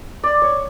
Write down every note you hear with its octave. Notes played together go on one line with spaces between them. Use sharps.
D5
C#5